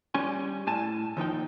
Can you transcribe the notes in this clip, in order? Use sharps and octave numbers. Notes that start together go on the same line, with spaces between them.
G3 C#4 G#5
A2 G#5 A5
D#2 F3 D#4 G5